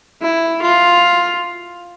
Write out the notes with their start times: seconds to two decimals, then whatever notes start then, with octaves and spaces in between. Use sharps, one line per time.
0.22 E4
0.62 F4